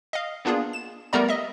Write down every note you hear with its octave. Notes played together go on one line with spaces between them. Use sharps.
D#5 F5
A#3 B3 D4 F4 G#4
E7
G3 A3 B3 A#4 D5 A#5
D#5 E5